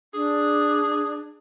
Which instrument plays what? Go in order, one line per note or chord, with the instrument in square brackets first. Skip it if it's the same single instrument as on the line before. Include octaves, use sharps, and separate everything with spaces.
[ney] D4 [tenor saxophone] G#4